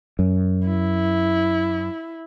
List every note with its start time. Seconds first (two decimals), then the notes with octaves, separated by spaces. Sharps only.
0.19 F#2
0.67 E4